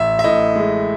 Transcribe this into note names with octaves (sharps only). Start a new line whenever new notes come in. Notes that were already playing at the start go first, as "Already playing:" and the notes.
Already playing: A1 E5
E5
A2 D#5
G#3